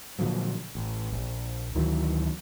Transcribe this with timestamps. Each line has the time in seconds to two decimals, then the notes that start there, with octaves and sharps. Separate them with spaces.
0.19 A#2 D3 F3 F#3
0.75 A1
1.12 A#1
1.75 D2 D#3 E3 F#3